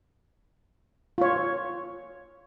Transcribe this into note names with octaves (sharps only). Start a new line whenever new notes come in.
F4 C#5